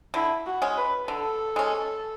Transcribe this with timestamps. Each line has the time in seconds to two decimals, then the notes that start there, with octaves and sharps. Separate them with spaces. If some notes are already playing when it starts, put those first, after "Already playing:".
0.14 D3 E4
0.46 F#4
0.62 G#3 C#4
0.77 B4
1.08 D3 A4
1.56 G#3 C#4